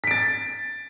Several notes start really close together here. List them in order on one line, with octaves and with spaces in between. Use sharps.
B6 D7 A6